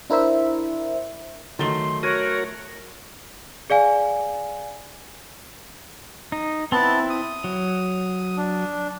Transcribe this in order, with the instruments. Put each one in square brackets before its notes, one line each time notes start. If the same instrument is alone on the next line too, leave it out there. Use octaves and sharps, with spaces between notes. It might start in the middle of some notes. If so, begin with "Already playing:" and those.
[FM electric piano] D4 E4 A#4 C5 E5
[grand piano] D#3 A6 G7 [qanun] F#3 A3 [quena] C6
[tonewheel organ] F#4 A#4 [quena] C#5 [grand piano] G#6 D#7
[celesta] G#4 D5 F5 G#5
[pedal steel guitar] D#4
[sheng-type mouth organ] B3 A5 [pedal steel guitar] C4 E4
[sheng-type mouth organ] D#6
[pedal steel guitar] F#3
[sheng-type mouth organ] D4